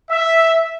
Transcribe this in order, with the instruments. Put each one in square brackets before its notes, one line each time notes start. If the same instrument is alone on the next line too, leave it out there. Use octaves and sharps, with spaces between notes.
[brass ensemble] E5